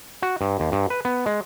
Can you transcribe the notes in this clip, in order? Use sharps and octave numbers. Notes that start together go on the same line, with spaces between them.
F#4
G2
D#2
G2
B4
B3
G#3